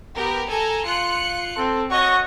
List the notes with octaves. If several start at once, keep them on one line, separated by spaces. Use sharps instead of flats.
B3 G4 A#4
A4 G#5 A#5
F4 F#6 C#7
C4 A4
F#4 C#5 D#5 C#6